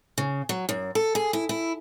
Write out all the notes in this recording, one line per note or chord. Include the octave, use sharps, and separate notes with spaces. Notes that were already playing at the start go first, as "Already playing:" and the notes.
C#3
F#3
F#2
A4
G#4
E4
E4